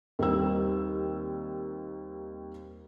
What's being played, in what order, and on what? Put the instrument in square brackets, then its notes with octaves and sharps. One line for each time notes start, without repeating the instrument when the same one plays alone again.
[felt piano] D#2 G3 C4 E6